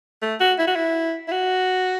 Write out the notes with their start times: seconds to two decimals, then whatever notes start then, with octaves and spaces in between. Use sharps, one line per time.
0.22 A3
0.40 F#4
0.59 E4
0.67 F#4
0.76 E4
1.28 E4
1.32 F#4